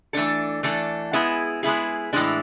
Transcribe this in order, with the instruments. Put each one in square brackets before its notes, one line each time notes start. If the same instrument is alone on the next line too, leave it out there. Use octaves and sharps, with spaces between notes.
[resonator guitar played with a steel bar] E3 A3 D4 A4
E3 A3 D4 A4
G#3 B3 E4 G#4
G#3 B3 E4 G#4
A2 E3 G#3 D4